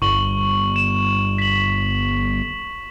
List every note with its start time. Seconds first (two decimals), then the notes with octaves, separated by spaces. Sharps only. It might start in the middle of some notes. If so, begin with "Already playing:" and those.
0.02 G1 C#6 F#7 G7
0.76 E7
1.38 B6 F#7